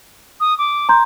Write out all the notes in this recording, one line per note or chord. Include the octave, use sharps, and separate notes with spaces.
D#6
D6
A#5 C6 G6